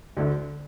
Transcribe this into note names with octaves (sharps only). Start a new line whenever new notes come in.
D2 D3 A3